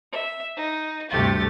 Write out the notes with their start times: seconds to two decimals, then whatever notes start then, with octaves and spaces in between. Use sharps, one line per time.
0.12 E5
0.57 D#4
1.10 D2 G2 C3 A3 G4 A6